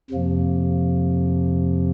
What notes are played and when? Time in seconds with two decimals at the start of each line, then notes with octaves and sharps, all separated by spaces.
0.10 F2 C3 F3 A#3